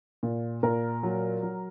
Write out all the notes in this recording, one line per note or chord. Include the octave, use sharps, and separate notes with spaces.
A#2
A#2 A#4
F#3
F#3